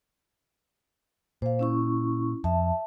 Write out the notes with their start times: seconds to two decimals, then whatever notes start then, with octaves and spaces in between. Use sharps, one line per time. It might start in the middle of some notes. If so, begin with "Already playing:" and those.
1.42 A#2 C5 F5
1.59 C#4 E4 C#6
2.44 F2 E5 A5